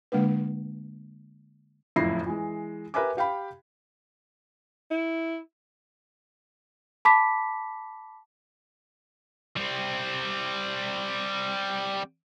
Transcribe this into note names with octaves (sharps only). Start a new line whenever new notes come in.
D3 G#3 A#3 D4 B4
F#1 F2 A2 E4 A#6 C7
E3 G#3
G4 A#4 B4 E5 G#5 D6
G4 F5 G5 B5
E4
A5 B5 D6 B6
G3 C4